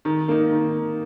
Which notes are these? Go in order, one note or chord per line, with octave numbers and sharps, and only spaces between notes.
D#3
A#3 D#4
D#3